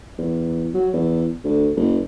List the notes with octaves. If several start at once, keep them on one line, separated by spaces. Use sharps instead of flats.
E2
F#3
E2
D2
F#1